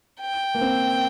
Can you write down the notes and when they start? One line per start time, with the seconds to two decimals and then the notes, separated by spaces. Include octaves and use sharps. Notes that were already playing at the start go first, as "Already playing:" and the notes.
0.21 G5
0.54 A#3
0.61 C4